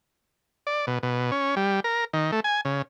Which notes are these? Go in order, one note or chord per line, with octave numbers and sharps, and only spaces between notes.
D5
B2
B2
C#4
G3
A#4
D#3
A3
G#5
C#3